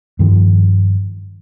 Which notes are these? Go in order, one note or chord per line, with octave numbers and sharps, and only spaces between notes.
G2 D#3 F3